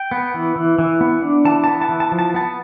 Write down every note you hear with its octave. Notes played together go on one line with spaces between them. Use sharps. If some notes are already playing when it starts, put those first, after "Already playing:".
Already playing: G5
B3
E3
E3
E3
B3
D4
E3 A5
B3 A5
A5
E3
A5
F3
A5
B3 A5